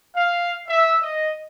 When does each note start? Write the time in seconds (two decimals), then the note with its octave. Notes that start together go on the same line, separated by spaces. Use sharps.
0.13 F5
0.66 E5
1.00 D#5